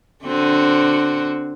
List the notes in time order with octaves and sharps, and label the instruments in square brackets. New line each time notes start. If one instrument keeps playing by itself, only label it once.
[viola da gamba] D3 C4 F#4